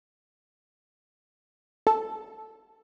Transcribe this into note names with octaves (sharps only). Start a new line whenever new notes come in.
A4